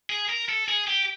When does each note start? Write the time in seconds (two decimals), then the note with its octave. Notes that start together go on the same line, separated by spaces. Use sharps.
0.10 G#4
0.29 A#4
0.49 A4
0.68 G#4
0.87 G4